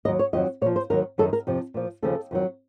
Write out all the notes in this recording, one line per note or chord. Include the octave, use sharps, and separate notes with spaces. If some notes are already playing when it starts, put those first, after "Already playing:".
D#2 D#3 F#3 D#5
C#5
F2 D#3 F#3 D#5
A#2 F3 C#5
C5
D#2 D#3 F#3 A#4
F#2 D#3 F#3 A4
A#4
F2 C3 F3
A#2 F3
D#2 C#3 F3 A4
F2 D#3 F#3